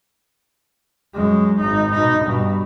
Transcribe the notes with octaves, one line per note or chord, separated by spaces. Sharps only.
F#2 G#3
G#1 D#4
B2 D#4
G2 B2